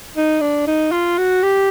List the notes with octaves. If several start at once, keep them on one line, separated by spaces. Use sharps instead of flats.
D#4
D4
D#4
F4
F#4
G4